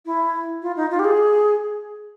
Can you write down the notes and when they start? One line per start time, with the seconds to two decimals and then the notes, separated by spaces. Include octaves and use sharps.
0.06 E4
0.62 F4
0.76 D#4
0.91 F4
0.99 G4
1.04 G#4